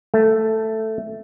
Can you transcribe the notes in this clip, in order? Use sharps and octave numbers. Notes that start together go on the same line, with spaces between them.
A3